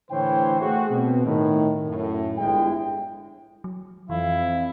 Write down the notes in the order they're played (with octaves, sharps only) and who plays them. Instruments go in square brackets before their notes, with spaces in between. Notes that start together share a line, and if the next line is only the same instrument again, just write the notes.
[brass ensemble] A2 D3 E3 C5 C#5 G5
A3 F#4 G#4
B2 C4
A2 D#3
F#2 A2
G1 G#3 E4 G5
[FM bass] F#3
[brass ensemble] F2 [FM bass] E3 [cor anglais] E4 [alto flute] F5